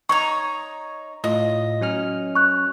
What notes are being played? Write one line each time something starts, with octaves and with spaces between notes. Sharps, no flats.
D#4 C#5 A#5 C#6
A2 F4 D#5
F#3 C#4 F6
C#6 F#6